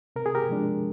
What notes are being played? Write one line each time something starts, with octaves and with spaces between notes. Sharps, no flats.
C3 A#4
G#4
G4 A#4
F3 G#3 D4